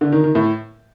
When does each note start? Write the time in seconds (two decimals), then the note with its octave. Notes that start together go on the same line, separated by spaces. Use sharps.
0.01 D3
0.12 D#3
0.24 D#3
0.35 A2